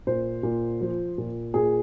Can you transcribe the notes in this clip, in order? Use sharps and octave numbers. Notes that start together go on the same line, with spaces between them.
A#2 C5
A#2
F3
A#2
A#2 G#4